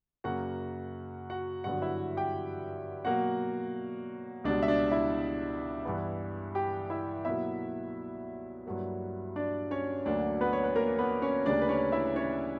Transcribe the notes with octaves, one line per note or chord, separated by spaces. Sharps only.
F#2 C#3 F#3 A#3 F#4 F#5
F#4 F#5
G2 D3 F#3 B3 F#4 F#5
E4 E5
G4 G5
B2 F#3 A#3 F#4 F#5
C#2 B2 G3 D4 D5
E5
D4 D5
E4 E5
G2 E3 B3
G4 G5
E4 E5
B2 F#3 A#3 E4 E5
G2 F#3 A#3
D4 D5
C#4 C#5
D2 D3 F#3 A#3 D4 D5
B3 B4
C#5
B4
A#3 A#4
B3 B4
C#4 C#5
D2 C#3 G3 A#3 D4 D5
B4
C#4 C#5
E4 E5
C#4 C#5